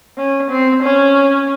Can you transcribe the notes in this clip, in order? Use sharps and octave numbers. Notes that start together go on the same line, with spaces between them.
C#4
C4
C#4